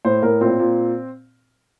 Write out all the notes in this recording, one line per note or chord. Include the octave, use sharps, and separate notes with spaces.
A2 C5
A2 A#4
A#2 C4
A#2